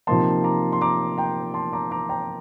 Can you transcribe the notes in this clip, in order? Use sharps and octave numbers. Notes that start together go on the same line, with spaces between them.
C3 F3 A#3 D#4 A5 C6
A#5 D6
C6
A#5 D6
G5 A#5
A5 C6
A#5 D6
A#5 D6
G5 A#5